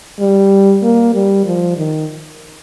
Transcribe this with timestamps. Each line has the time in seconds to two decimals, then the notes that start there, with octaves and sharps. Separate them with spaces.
0.20 G3
0.83 A#3
1.15 G3
1.46 F3
1.77 D#3